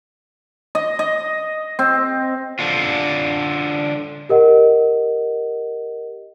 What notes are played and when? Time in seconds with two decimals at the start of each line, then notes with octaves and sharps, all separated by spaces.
0.75 D#5
0.99 D#5
1.79 C4
2.59 D3 D4 F4
4.29 G4 A#4 D#5 F#5